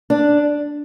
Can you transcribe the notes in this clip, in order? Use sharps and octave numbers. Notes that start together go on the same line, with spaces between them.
D4